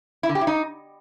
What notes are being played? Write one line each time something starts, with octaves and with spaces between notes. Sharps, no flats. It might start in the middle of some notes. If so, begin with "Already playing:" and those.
E4
D3
G4
E4
D#4